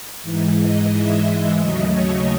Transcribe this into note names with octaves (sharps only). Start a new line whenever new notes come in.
G#2 E3 G#3
D#5
E5
D#2 C#3 F#3 A3 D#5
C#5